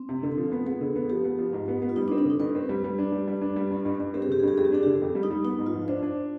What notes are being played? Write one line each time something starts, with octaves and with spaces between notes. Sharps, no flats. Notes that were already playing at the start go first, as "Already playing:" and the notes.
Already playing: C4
C3
D3
F3
B3
B3 G#4
D3
B3
F3 G4
B3
F3
G#2
B3
B3
F4
G3 D#4
D4
C4
D4
D3 D#4
G2 B4
C4
G3
G3
D4
G3
G3
D4
G3
G2
G2
G2
C4 G4
G#4
D3 G4
G#4
G2 G4
F2 G#4
G4
D4 G#4
D3 G4
F2
G3
D#4
G3
B3 D#4
G#2
F4
F3
D4 C5
D4